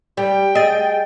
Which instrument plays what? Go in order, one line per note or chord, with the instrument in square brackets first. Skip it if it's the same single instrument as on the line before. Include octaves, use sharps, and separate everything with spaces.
[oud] G3 [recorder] G5
[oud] G#4 [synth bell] D#5 A6